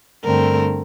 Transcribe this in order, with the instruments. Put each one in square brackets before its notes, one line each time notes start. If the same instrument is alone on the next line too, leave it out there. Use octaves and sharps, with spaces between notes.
[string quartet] G2 D3 A3 C4 A#4